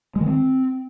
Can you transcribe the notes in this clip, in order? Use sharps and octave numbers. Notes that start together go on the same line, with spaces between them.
G#3
D#3
C4